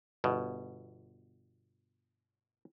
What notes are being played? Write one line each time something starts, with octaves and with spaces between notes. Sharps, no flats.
G1 B2